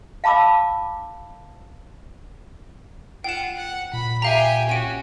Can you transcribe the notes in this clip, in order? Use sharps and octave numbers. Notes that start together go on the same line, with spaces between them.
F5 A5 B5 D6 E6
F4 F#5 G5 E7
F#5
A#2 B5
G4 E5 F5 G#5 A#5
C#4 F#4 D7 D#7